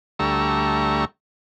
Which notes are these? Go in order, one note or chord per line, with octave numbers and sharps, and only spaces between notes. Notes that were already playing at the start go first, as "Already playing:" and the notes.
D2 G3 A3 E5 A#5 C#6